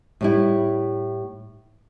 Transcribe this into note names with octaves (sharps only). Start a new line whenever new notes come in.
A2 G3 E4